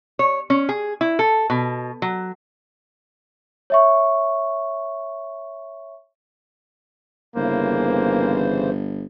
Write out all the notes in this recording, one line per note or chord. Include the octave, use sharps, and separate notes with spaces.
C#5
C#4
G#4
E4
A4
B2
F#3
C#5 E5 C#6
G1 C#3 E3 A#3 C5